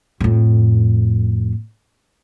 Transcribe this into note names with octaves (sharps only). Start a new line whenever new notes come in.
F2 A2